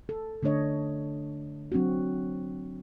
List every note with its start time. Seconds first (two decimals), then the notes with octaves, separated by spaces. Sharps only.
0.09 A4
0.43 D3 A3 D4 C#5 D#5
1.72 F#3 C4 D4 F#4